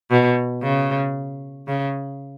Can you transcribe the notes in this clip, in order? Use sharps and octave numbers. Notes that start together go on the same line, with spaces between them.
B2
C#3
C#3